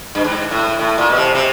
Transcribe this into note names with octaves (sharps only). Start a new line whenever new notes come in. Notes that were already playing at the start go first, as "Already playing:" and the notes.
G2
G#2
A2
A2
A#2
B2
C3
C3